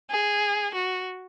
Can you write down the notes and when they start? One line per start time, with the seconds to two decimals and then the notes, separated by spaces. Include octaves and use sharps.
0.11 G#4
0.75 F#4